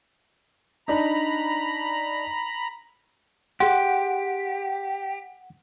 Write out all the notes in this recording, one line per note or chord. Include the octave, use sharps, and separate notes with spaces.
D4 D#4 A#5 B5
G4 G#4 F#5 C6